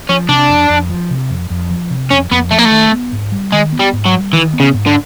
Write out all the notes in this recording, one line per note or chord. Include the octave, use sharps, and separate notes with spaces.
F3 C#4
C3 D4
F2
F2
F3
C3
F2
F2
F3
C3
F2 C#4
F2 B3
F3 A3
A#3
A3
D#3
B3
G#2
G3
D#3 G#3
B3
G3
G#2
F#3
G3
D#3 E3
B3
C#3
G#2
D3